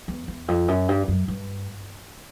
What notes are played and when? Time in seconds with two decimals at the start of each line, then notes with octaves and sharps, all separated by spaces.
0.08 E2
0.28 E2
0.48 F2
0.68 F#2
0.89 G2
1.08 F#2
1.28 G2